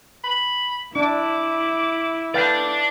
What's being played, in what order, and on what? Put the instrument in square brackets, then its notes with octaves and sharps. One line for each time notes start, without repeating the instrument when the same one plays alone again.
[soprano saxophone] B5
[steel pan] D4 [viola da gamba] E4 [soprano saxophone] D6
[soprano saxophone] A3 [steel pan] B4 F5 G5 [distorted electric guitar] D5 A5